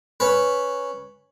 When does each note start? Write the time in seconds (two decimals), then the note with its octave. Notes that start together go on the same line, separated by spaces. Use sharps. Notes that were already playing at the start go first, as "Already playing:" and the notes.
0.20 C#4 B4